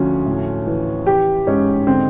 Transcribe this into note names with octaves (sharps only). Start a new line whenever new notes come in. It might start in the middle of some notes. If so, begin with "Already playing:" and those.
Already playing: D2 F3 C#4
A2
E3
E3 G4
G#2 C#4
D3 C4